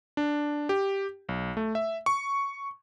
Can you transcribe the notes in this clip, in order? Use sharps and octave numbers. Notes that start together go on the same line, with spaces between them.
D4
G4
B1
A3
E5
C#6